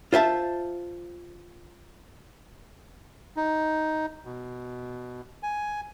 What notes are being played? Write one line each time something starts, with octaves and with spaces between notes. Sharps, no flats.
F4 C5 E5 A5
D#4
B2
G#5